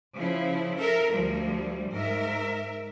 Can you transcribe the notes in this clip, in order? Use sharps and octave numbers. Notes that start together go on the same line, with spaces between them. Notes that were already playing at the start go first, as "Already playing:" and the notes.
C#3 F3 E4
A4 A#4 E5
D2 F3 G3
G#2 A#4 E5